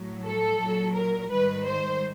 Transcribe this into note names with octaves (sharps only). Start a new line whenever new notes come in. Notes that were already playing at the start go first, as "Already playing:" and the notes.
Already playing: A2 F#3
A4
A#2 F#3
A#4
G#2 D#3 G3 B4
C5